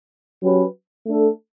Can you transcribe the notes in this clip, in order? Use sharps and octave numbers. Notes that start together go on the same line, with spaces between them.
F#3 C#4 G4 B4
A3 D4 A4